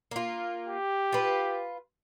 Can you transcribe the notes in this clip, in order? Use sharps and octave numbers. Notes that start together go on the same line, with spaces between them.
A#3 F4
G4
F4 B4